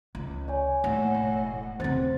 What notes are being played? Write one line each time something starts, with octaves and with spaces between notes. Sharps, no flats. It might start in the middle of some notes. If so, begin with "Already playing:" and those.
C#2
C#5 D5 G#5
A2 A#3 F#5
E1
E2 C#3 C4 C5 A6